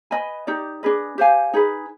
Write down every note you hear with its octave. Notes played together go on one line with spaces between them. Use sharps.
B4 D#5 G#5 B5
D#4 G4 D5
D4 G#4 B4 D#5
G4 C5 F5 G#5
D#4 G#4 B4